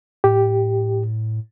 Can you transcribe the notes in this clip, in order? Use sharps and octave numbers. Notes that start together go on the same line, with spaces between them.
A2 G4